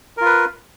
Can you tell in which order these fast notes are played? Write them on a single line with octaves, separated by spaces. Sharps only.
A#4 F4 B4